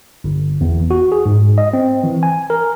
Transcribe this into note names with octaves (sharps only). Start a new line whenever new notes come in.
G1
E2
F#4
G#4
G#2
D#5
C4
E3
G#5
A#4